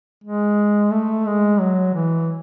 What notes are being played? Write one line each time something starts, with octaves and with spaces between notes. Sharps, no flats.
G#3
A3
G#3
F#3
E3